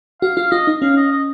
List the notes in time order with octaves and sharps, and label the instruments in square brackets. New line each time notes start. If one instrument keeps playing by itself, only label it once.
[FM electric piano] F#4 [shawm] F5
[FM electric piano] F4 [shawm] F5
[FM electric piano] F4 [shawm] D#5
[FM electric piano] D#4
[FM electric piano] C#4 [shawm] F5
[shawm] D#5
D#5